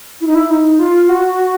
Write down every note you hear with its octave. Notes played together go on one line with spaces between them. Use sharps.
E4
D#4
E4
D#4
F4
F#4